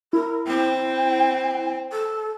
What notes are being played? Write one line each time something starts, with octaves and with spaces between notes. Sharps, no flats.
E4 A#4
C4 G5
A4